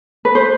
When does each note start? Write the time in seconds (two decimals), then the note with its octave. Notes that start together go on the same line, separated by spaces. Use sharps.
0.25 B4
0.35 C5